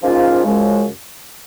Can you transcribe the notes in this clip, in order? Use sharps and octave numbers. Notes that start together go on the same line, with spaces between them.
G#2 F3 A#3 C#4 F4
F#2 C#3 F3 G#3